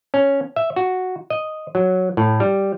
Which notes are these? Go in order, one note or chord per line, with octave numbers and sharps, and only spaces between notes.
C#4
E5
F#4
D#5
F#3
A2
G3